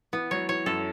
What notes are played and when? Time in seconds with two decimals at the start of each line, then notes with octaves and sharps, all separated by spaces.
0.13 E3 B3
0.31 F#3 C#5
0.49 E3 C#5
0.66 F#2 A4